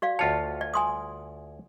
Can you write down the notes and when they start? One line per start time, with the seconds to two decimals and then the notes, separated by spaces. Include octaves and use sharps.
0.02 F#4 D5 F5
0.19 D2 F4 C#5 A5
0.61 D5
0.74 G#5 C6 D#6